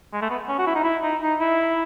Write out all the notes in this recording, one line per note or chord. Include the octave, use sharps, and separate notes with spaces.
G#3
A3
B3
C#4
F#4
E4
D#4
E4
D#4
D#4
E4